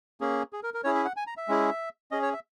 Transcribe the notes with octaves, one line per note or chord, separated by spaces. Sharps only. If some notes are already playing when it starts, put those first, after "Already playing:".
A#3 C#4 G#4
G#4
A#4
A#4
C#4 E4 G#4 C#5
E5
F#5
G#5
A#5
E5
G#3 C#4 E4 G#4
C#4 G#4 D#5
C#5
E5